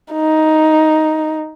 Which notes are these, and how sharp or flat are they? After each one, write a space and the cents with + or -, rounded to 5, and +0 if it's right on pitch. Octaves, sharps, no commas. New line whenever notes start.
D#4 +5